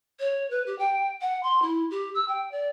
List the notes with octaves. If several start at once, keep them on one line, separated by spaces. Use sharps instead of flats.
C#5
B4
G4
G5
F#5
C6
E4
G4
E6
G5
D5